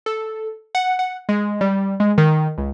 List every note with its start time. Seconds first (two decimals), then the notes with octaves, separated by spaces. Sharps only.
0.06 A4
0.75 F#5
0.99 F#5
1.29 G#3
1.61 G3
2.00 G#3
2.18 D#3
2.58 C#2